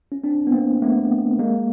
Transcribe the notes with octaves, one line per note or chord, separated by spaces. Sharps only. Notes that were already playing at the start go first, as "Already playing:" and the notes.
C#4
C4 D4
B3
A#3 C4
A3 B3
G#3 A#3